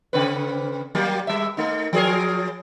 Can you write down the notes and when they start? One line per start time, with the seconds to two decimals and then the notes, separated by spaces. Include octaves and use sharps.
0.13 C#3 C4 B4
0.95 F#3 A#3 G4
1.27 G3 E5
1.57 A3 D#4
1.93 F3 G#4 A#4